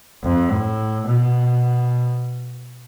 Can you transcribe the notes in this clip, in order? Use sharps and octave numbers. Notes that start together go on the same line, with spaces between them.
F2
A2
B2